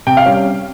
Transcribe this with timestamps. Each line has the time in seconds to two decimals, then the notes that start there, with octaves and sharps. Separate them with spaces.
0.07 C3 G5
0.17 F5
0.26 G3 C#4